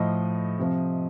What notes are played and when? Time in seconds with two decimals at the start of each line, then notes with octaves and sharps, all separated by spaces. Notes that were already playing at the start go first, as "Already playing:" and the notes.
Already playing: A2 F3 D#5
0.58 C3 F3